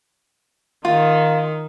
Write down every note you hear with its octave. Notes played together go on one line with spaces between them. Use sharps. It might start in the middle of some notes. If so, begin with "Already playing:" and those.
D#3 D#4 F4